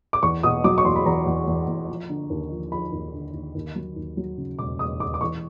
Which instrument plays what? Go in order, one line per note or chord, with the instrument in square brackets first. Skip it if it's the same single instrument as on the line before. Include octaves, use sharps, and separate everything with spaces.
[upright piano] D6
E2 C#6
B2 D#6
F#3 D6
C#6
E2 C6
B5
E2 A#5
E2
E2
E2
F3
D3
D#2
F3
F3 B5
D#2
D3
D#2
D#2
F#3
D#2
F#3
C#3
E1 D6
E1 D#6
D#2 D6
D6
E3 C#6